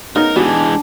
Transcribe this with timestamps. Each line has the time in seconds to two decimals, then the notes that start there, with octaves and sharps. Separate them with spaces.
0.16 C#3 B3 D#4 A#4
0.36 E3 G#3 B3 D4 F#4 G4 G#5 A5